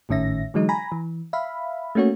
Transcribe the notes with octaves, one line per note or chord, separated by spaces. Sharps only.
G#1 A2 D#3 C#4 E5 A#6
D3 E3 F#3 G#3 D#4
G#5 A#5 B5 A#6
E3
E5 F5 B5
A3 A#3 C#4 F#4 C#5